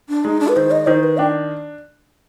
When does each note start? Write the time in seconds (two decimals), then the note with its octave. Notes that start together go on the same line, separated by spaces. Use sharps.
0.09 D4
0.24 G#3 D#4
0.40 D4
0.48 B4
0.56 D#3 C5
0.71 D#5
0.87 D#3 C5
1.03 B4
1.18 D4 G5